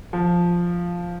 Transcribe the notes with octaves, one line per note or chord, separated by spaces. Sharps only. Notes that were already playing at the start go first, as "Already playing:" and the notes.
F3